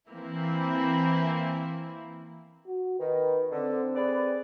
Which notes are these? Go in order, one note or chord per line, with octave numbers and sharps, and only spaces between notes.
E3 A#3 C4 E4
F#4
D#3 B4
D3 C4
G#4 B4 D5